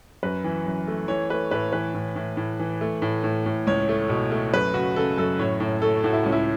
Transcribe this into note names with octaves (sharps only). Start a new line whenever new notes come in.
F#2 B4
E3
F#2
A3
E3 C#5
A3 B4
A2 B4
E3 B4
A2
A2
A2
E3
A3
A2
A2
A2
C#2 C#5
A3
B2
A3
F#2 B4
C#3 F#4
C#3 A4
F#2 A4
A2 C#5
A2
A3 A4
A2 F#4
E4
C#2 C#4
E4